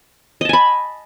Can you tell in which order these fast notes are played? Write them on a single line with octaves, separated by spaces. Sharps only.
D#5 A5 G#5 B5